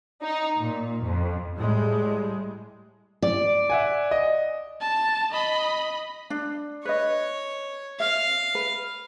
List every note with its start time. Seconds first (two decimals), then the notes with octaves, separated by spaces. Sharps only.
0.23 D#4
0.59 A#2
1.04 F2
1.56 A2 G3 G#3
3.22 D5
3.70 E5 F#5 G#5
4.11 D#5
4.81 A5
5.31 D#5 B5
6.30 D4
6.85 B4 C#5 D#5
8.00 E5 F5
8.55 B4